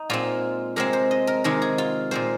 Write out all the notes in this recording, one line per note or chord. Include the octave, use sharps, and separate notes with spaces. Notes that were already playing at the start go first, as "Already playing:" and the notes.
Already playing: D#4
A#2 G#3 C4 F4
C3 G#3 C4 A#4
C5
D#5
A#4
C3 D#3 G#3 A#4
G#4
F4
A#2 G#3 C4 C5